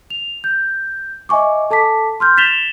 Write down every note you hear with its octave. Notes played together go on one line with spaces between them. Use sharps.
F7
G6
D#5 E5 G#5 C#6 D6
A4 A5 D6 B6
C6 F6 G6
A6 B6 E7 F7 G7